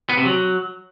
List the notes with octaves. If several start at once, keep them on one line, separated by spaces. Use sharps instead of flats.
B3
C3
F#3